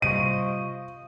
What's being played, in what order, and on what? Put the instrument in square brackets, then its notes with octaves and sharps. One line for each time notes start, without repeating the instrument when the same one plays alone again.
[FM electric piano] C3 G3 C#6 [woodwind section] F4 C5 D#5 [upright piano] D#7